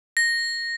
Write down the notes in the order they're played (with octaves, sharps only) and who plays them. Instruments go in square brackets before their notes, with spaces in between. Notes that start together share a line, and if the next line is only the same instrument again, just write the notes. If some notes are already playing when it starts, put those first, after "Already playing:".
[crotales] A#6